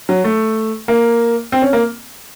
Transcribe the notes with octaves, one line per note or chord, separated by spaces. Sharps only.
F#3
A3
A#3
C4
C#4
A#3